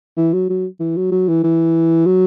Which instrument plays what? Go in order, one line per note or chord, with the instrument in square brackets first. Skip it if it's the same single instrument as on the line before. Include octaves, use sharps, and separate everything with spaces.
[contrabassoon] E3
F#3
F#3
E3
F#3
F#3
E3
E3
F#3